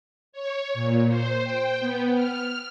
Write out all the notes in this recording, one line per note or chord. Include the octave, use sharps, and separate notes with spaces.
C#5
A#2
C5
G5
B3
F6